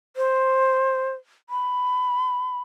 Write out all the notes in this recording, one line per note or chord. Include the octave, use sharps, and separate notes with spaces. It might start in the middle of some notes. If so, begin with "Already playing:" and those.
C5
B5